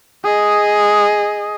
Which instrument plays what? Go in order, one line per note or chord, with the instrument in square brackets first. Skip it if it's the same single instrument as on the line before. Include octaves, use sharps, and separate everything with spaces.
[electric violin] G#4 D#5